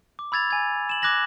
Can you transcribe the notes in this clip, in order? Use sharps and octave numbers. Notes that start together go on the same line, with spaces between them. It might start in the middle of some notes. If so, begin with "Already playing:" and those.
D6
B5 E6 G#6 A6 F7
G#5 G#6
E7 F#7
D6 F#6 G#6 A#6 F#7